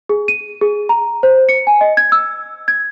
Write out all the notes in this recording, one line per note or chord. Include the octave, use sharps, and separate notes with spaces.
G#4
D#7
G#4
A#5
C5
C#7
G#5
D#5
G#6
E6
G#6